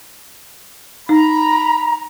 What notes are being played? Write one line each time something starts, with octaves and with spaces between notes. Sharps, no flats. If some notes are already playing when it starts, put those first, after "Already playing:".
D#4 A#5 B5